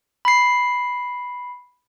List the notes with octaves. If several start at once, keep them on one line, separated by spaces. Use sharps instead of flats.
B5 C7